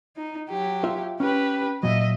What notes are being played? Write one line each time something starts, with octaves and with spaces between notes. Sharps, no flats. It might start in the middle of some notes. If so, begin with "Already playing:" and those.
D#4
F#3 G4
F4 E5
C#4 G4 B4
A#2 F#3 D#5 E5